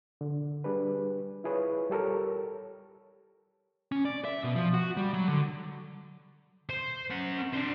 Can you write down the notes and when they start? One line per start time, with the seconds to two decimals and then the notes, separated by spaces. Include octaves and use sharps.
0.21 D3
0.64 G3 D4 G#4 B4
1.44 E4 F4 G#4 B4 C#5
1.90 G3 G4 A4 A#4 C#5
3.92 C#4
4.05 D5
4.25 E5
4.44 B2
4.55 F3
4.74 F#4
4.97 G3
5.14 F#3
5.28 D3
6.69 C5
7.11 C#4 F#5
7.54 D4 C5